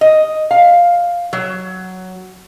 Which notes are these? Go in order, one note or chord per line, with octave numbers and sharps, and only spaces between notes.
D#5
F5
F#3